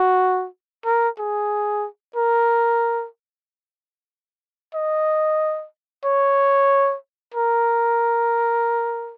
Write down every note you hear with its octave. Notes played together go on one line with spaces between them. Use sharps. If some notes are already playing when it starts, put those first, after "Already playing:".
Already playing: F#4
A#4
G#4
A#4
D#5
C#5
A#4